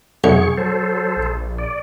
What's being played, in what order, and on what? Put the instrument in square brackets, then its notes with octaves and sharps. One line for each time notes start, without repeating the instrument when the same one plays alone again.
[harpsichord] B1 [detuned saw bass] F2 [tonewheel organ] G#4 C#6
[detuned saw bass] F#3 [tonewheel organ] A4 C5
[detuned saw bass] A#1
[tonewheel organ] D5